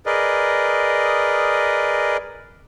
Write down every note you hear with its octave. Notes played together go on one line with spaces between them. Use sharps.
G#4 A#4 B4 D5 D#5